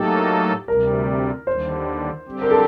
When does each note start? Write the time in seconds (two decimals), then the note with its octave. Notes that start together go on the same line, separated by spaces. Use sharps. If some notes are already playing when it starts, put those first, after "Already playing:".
Already playing: A2 F#3 A#3 D#4 G4 A4
0.68 D2 C3 G3 A#4
1.47 D#2 D3 G3 C5
2.26 D3 G3 C4 G4
2.42 A#4
2.51 A4